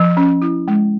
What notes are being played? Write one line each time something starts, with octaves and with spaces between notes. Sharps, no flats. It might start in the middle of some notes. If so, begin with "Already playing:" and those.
Already playing: F3
C#4
E4
G#3